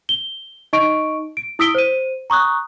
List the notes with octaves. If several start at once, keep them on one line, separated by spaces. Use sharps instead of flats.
G7
D#4 D#5 C#6 D7
D7
E4 D#6 E6 B6 D7 G7
C5 D#7
A#5 C#6 D#6 F#6